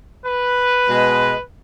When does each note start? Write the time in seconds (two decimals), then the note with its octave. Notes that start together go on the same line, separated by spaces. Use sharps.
0.26 B4
0.89 B2 G#3